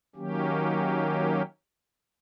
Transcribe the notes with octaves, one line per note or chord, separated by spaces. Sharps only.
D#3 F#3 A#3 C#4 G4